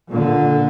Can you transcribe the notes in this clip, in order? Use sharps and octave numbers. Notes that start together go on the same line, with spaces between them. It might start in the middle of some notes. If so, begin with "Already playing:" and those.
A#2 D3